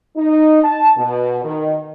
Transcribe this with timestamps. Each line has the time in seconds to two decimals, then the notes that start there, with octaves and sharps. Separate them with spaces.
0.16 D#4
0.63 A5
0.98 B2
1.44 D#3